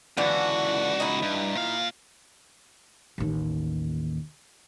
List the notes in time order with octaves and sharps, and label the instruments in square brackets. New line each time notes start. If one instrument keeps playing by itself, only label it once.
[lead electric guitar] C#2 F#4 [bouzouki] D3 E3
[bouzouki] D#4 E4
[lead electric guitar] G2
A#2 F5
[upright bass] A1 D#2